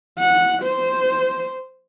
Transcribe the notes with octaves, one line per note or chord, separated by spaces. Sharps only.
F#5
C5